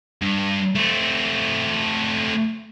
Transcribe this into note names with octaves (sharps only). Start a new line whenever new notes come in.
G2
A3 C4